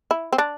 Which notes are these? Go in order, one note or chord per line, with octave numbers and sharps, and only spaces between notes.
E4
C4
D4